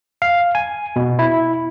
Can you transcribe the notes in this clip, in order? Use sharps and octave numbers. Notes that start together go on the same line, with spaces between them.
F5
G#5
B2
E4